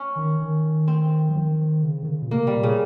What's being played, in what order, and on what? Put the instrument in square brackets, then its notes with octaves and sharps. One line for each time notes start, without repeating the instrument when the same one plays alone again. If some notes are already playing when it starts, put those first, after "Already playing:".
Already playing: [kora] C#4
[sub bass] D#3
D#3
[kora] C4
[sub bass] F3
D#3
C#3
D#3
C#3
A#2
[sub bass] C3 [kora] A#3
[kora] G3
[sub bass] A#2
[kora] C#3